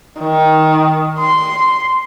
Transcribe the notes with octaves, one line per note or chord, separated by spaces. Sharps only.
D#3
C6